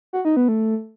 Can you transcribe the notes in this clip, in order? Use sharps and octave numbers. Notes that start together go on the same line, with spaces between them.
F#4
D#4
B3
A3